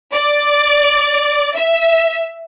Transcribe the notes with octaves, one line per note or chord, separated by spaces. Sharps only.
D5
E5